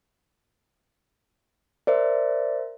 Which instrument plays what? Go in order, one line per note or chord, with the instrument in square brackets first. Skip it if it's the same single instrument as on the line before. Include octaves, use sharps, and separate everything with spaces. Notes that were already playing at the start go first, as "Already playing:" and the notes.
[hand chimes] A#4 C5 E5 [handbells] D5